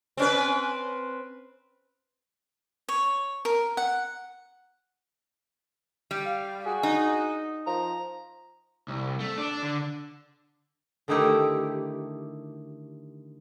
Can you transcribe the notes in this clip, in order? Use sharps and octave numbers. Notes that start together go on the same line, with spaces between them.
C4 C#4 B4
C#5
A#4
F#5
G3
F5
F#4 G#4
D#4
F3 A#5
C2
A3
D4
D3
D3 D#3 A3 D#4 E4 G4